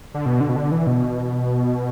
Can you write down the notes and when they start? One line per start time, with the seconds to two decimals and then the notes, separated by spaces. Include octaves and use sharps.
0.14 D3
0.26 B2
0.40 D3
0.49 B2
0.56 D3
0.72 E3
0.87 B2